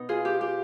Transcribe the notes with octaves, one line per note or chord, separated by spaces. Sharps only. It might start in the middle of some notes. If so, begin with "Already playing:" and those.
Already playing: B2 B3 D#4
F4 G#4
G4
G4